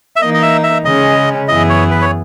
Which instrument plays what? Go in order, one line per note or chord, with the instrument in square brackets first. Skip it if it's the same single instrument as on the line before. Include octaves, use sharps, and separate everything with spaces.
[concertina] E5
[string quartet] E3 A#3 D#4 [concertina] D#5
[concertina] D#5
E5
E5
[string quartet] C#3 G#3 C#4 [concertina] D#5
[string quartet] F#2 E3 B3 E4 G#4 [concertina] D#5
[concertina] C#5
B4
C#5